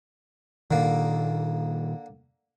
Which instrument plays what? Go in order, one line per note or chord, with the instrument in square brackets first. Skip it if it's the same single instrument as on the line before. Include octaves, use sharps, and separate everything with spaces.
[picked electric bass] A#2 D#3 [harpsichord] D3 A#3